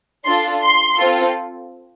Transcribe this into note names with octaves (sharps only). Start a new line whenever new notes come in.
D4 F4 A4 C6
C6
C4 F4 A4